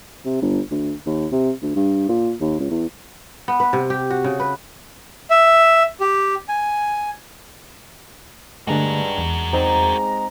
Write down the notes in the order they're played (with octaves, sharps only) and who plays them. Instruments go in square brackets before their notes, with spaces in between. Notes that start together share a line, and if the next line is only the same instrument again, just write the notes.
[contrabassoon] C3
G1
D2
D#2
C3
D2
G2
A#2
D#2
C#2
E2
[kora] B3
B4
C3
G4
F#4
C#3
B4
[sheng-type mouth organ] E5
G4
G#5
[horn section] G2 [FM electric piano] D3 A3 [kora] G#3 D4 [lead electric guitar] F#4 A#4
[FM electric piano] E2
[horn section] G#3 A#5 [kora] C4 D#4 D5